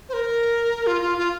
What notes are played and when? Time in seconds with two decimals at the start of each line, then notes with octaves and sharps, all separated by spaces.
0.09 C5
0.13 A#4
0.87 F4
1.02 F4
1.18 F4